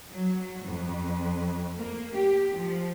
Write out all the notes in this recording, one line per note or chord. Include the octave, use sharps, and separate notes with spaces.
F#3
F2
A#3
G4
F3